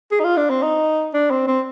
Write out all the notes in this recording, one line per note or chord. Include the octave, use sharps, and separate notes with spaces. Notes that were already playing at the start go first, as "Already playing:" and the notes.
G#4
D#4
F4
D4
C4
D#4
D4
C4
C4